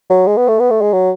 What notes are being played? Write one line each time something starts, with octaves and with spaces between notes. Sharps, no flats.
F#3
G#3
B3
A3
B3
A3
G#3
F#3